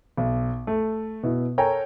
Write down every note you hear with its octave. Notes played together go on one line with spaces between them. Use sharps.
B1
A3
B2 E4
A4 A#4 C#5 G5 G#5 A#5